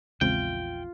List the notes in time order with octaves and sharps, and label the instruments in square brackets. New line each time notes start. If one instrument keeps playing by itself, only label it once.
[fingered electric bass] A#1 E2 [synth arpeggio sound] C#3 G#3 C4 [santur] F4 [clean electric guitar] G5